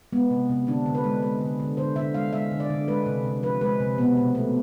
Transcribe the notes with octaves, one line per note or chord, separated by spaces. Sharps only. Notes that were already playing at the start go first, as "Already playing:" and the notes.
G#3 B3
C3
C3
D3 D4
D3
B4
G#3
G#3
D3
D3
D3 C5
D3 E5
G#3 F5
G#3 E5
D3
D5
D3
G#3 B4
C3
C3
F3 B4
G#3 B4
C3
B2 B3
B2
A3